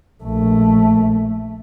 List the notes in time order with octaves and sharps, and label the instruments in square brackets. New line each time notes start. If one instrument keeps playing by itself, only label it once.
[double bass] A#1 A3